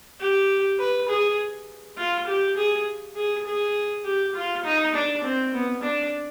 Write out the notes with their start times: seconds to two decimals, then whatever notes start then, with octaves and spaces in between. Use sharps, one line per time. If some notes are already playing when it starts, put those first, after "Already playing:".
0.20 G4
0.79 B4
1.09 G#4
1.97 F4
2.27 G4
2.57 G#4
3.16 G#4
3.47 G#4
4.05 G4
4.35 F4
4.64 D#4
4.95 D4
5.24 C4
5.54 B3
5.83 D4